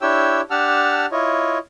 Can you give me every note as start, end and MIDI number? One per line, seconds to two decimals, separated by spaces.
0.01 0.41 62
0.01 0.41 64
0.01 0.41 67
0.01 0.41 73
0.01 0.41 79
0.01 0.41 88
0.50 1.06 62
0.50 1.06 67
0.50 1.06 78
0.50 1.06 81
0.50 1.06 88
0.50 1.06 89
1.12 1.58 64
1.12 1.58 65
1.12 1.58 73
1.12 1.58 75